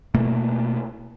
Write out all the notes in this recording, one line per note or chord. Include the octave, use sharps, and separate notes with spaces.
B2 A3 A#3